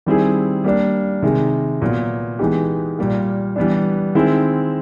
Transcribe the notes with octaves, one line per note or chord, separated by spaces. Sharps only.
D#3 G3 C4 E4 G#4
G3 A#3 D4
C3 D#3 G#3
A#2 F#3 B3
E3 G#3 B3 D#4 G4
A#2 G3 A#3
E3 G3 B3 D4
D#3 G#3 C4 E4